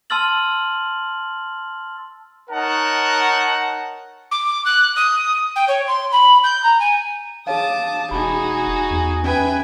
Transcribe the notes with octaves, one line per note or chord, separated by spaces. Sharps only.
A5 C6 E6 F6 A6 F#7
D#4 A#4 C#5 F#5 A5
D6
F#6
D#6
G5
C#5
C6
B5
G6
A#5
G#5
G#4 C#5 F5 A5 D6 D#6
E1 D#4 F#4 G#4 B5
E2
C#4 B4 E5 G5 G#5